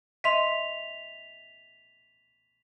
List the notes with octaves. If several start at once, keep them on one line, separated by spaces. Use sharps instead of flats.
D#5 E5 C6 B6 F7